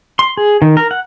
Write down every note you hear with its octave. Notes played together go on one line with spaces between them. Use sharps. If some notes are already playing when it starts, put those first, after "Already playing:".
C6
G#4
D#3
A#4
F#5